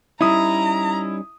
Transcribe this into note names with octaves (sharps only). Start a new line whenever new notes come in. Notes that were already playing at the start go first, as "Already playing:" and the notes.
G3 C#4 D#4 E4 A#5 D#6